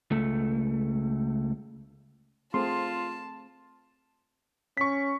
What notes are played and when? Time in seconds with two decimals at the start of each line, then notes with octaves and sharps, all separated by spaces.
0.11 C#2 A3
2.54 A3 C4 F4 G#4 A5 C6
4.77 C#4 C#6 B6